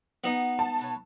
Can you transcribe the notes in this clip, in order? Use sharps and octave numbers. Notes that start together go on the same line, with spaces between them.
B3 D#4 F#4 F#5
A5
B2 B4 C#5